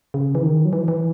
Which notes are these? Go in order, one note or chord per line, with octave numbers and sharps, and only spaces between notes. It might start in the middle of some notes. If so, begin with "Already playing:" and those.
C#3
E3
D#3
F#3
E3
E3